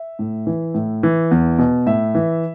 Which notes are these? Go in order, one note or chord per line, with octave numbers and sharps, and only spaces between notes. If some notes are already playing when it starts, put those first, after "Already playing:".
Already playing: E5
A2
E3
A2
E3
E2
B2
A2 E5
E3